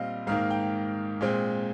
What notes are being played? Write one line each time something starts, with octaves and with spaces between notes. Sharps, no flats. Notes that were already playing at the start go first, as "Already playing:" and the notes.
Already playing: A#2 G3 C4 D#5 F5
G#2 D#3 A#3 F5
G5
A#2 G#3 C4